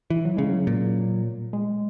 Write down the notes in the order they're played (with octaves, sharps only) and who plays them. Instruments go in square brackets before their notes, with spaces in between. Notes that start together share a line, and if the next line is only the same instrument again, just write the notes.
[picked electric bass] E3
[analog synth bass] F#3
[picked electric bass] C#3 [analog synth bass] G#3
[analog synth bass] F#3
[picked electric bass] A#2
[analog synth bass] G#3